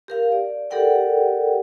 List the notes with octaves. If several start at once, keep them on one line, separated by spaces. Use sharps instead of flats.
G4 A#4 F5
D5
G4 A4 A#4 D5 F#5 G5